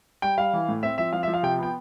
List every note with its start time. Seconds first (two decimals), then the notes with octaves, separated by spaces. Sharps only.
0.22 G3 G5
0.38 G3 F5
0.53 E3
0.68 A2
0.83 C4 E5
0.98 F3 E5
1.13 F3 F5
1.23 E5
1.28 F3
1.34 F5
1.43 C3 G5
1.59 B3 G5